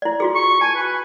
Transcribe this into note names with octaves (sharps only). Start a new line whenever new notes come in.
E4 D5
F4 F#4 G#4
C#6
G#5 A5
B4